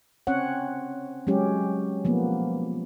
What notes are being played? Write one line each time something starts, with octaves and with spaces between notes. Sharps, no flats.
C4 C#4 C#5 F#5
F#3 G#3 C#4 G4
F3 A#3 B3